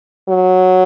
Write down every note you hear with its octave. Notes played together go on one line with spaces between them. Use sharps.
F#3